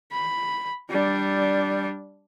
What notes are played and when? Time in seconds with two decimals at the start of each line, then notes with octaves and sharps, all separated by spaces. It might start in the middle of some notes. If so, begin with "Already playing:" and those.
0.12 B5
0.90 G3 D4